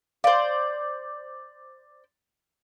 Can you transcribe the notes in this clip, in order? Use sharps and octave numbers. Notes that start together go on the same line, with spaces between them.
C5 D5 F5